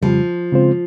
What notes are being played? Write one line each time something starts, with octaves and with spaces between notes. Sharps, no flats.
F2 C#3 F3 G3
C#3 G#3 C4 F4 C5